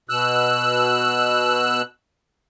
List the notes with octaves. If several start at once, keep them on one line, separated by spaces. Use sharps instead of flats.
B2 E6 F#6